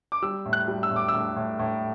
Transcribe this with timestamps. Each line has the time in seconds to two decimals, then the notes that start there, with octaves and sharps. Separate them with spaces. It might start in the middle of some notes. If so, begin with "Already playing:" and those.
0.12 D6
0.22 G3 E6
0.45 A2
0.53 F#6
0.68 G3
0.83 E6
0.91 A2
0.96 D6
1.08 E6
1.14 A2
1.36 A2
1.59 A2